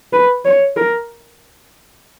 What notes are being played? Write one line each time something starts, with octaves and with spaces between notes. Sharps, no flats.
B4
C#5
A#4